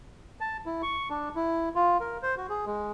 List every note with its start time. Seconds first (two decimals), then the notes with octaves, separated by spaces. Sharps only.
0.40 A5
0.66 E4
0.82 C#6
1.10 D4
1.36 E4
1.75 F4
2.00 A#4
2.23 C5
2.37 F#4
2.50 G#4
2.66 G#3